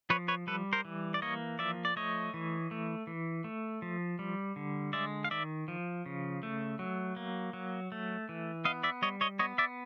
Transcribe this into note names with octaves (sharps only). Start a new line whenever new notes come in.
F3 B4 C#5
B4 C#5
G3 A4 B4
A#4 C5
E3
D5
A#3 C#5 D#5
F3 D5 E5
D5
A3 C#5 D#5
E3
A3
E3
A3
F3
G3
D3
G#3 D5 E5
F5
D#3 D5 E5
F3
C#3
A3
F#3
A#3
F#3
A3
E3
B3 D#5 F5
D5 E5
G3 C#5 D#5
C#5 D#5
B3 C#5 D#5
D5 E5